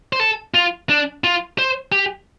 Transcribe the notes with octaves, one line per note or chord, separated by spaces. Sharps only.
C5
A4
F4
D4
F4
C5
G4